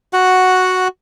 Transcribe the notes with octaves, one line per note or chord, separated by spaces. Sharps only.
F#4 F#5